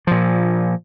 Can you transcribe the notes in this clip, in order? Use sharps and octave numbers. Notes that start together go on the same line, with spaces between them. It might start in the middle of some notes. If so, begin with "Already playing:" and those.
A#2 F3